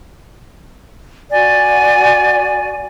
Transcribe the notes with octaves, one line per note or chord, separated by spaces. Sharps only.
F#4 D5 G#5